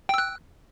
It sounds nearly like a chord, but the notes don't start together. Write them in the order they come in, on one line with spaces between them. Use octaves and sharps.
G5 E6 F#6